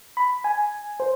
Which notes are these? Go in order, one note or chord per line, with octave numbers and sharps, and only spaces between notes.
B5
G#5
C5